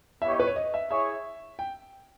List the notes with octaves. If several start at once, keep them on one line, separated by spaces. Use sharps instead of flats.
B3 E4 G4 C#5 E5
D#5
B4
C#5
D#5
E5
E4 G#4 C#5 E5
G5